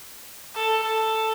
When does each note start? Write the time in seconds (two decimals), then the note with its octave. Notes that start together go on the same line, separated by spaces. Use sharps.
0.55 A4
0.83 A4